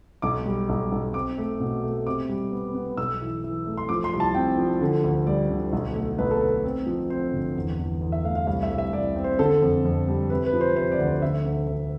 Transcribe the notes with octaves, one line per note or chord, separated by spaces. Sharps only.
B1 D6
G3
B1
B1
C4 D6
A3
B2
A3
C3 D6
G3
B3
B3
B1 E6
E3
E3
A3
C6
F3 D6
C6
C2
A5
C4 G5
F3
D3
D2
G3 D5
D2
B1
A3
B1 B4
A4
A3 B4
C4
F3
C4 C5
G1
E2
E2
E2
E5
A3 F5
F5
C2 F5
E5
C2
E5
C2 D5
C4
C5
D3 A4
F2
F2
G3
C3 B4
B4
F3
C5
C3 C5
D5
D2
C5
D3 E5
D2
D2